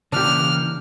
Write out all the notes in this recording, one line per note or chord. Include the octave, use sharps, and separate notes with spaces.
C#3 E3 A#3 D4 G4 F6